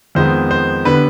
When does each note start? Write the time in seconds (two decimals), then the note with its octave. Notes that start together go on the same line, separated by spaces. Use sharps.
0.15 F2 D#3 G#3 B3 C5
0.51 C5
0.85 D3 G3 B3 B4